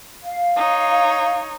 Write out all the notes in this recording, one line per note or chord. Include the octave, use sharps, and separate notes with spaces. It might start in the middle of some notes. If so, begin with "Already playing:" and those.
F5
D#4 C#5